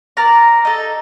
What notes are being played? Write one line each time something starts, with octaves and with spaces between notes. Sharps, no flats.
A#4 D5 A#5
D#4 A4